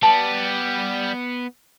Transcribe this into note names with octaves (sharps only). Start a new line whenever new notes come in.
G3 B3 A5